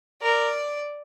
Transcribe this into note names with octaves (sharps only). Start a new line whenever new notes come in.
A#4 D5